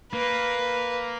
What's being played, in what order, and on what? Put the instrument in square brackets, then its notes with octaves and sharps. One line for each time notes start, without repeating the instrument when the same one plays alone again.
[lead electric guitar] A#3 [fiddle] B4